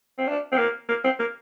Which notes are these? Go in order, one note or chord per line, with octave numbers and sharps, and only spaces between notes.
C4
D4
C4
A#3
A#3
C4
A#3